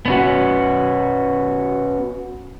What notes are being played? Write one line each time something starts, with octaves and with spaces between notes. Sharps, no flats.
B3 C#4 F#4